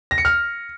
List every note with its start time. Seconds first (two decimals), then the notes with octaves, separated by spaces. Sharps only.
0.11 A#6
0.18 C#7
0.25 F6